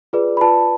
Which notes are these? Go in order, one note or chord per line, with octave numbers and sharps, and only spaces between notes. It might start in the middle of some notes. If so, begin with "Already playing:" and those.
F4 G#4 B4 D5
B5
F4 B4 D5 A5